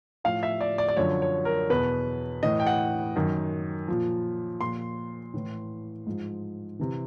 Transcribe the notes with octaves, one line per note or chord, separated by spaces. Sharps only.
A2 F3 F5
E5
D5
D5
D5
F#2 D3 F3 C#5
C#5
A#4
E2 B2 B4
A2 E3 D#5
G5
F#5
F#2 D#3
A#2 F3
A#2 F3 C6
A2 E3
G#2 F3
C3 E3